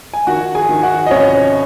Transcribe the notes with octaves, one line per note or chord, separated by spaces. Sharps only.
G#5
D#3 F#4 F#5
G#4 G#5
D#3
F#4 F#5
D#5
C2 C#4 C#5